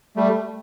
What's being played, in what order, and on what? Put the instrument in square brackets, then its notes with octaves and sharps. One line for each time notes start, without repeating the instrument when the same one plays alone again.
[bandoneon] G3 A3